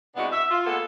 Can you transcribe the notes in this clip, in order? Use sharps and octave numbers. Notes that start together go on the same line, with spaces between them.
C3 G#3 B3 D4 E4 F#4
E5
F4
G#3 A#3 B3 A4